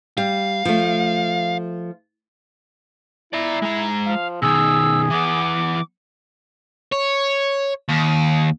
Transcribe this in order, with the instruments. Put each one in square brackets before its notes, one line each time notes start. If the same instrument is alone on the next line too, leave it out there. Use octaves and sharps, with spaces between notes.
[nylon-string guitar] G3 [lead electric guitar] F5
[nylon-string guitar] F3 A3
[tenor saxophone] E4 [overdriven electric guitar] D5 A#5
[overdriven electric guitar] G#3 A#5
[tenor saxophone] F3 [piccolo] F5
[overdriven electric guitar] B2 D#3 [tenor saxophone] G#4 [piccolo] E6
[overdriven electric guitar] E3 B3 [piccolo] D6
[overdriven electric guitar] C#5
D#2